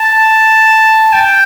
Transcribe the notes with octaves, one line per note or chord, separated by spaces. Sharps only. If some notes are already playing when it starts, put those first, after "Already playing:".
Already playing: A5
G5